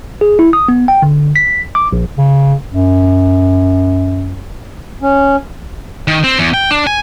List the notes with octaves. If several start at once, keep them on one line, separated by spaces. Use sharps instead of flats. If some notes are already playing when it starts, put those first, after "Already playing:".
G#4
E4
D#6
B3
G5
D3
B6
D6
A#1
C#3
F#2
C#4
D#3
C4
E2
G5
D4
G#5